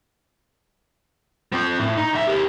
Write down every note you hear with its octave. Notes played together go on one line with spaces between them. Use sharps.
F3 C4
A2
D#4
B1 E5
G4 A#4